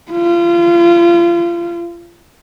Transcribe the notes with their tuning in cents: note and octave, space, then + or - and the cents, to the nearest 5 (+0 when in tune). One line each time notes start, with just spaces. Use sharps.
F4 -30